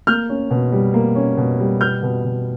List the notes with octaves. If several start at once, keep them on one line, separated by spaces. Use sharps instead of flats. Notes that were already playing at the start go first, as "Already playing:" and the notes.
A#3 F6 G6
C#4
B2
G3
A#3
C#4
B2
G3
B3 F6 G6
B2
B2